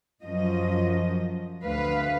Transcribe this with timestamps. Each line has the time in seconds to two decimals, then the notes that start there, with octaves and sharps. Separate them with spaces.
0.23 F#2 F3 D#5
1.64 D2 B4 F5